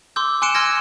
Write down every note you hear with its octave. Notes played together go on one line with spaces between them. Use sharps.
C6 D6 E6 G6
G#5 C6 F#6 C#7 D7 E7
G#5 C6 E6 F6 G#6 A#6